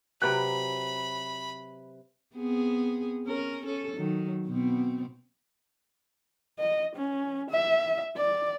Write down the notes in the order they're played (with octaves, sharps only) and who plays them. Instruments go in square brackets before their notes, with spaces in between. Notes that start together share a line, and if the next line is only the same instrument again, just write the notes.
[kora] C3 F#3 [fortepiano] B4 F#6 [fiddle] B5
[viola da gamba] B3 C4 G#4
C#4 A#4
C#4 A4
D#3 F#3
B2 B3 C4
[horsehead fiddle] D#5
C#4
E5
D5